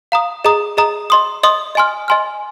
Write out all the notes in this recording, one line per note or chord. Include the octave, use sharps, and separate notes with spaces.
F5 A#5 D#6
G#4 D#5 A#5 D#6
G#4 D#5 A#5 D#6
D#5 C6 D#6
D#5 C6 D#6
D#5 G#5 C6 F6
D#5 G#5 C6 F6